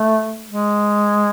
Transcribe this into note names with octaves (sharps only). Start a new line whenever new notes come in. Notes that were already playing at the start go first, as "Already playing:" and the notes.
Already playing: A3
G#3